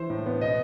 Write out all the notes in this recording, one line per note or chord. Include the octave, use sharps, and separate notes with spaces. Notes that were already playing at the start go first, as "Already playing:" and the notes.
Already playing: E3 E4 C5
A2
B3
B2 D#5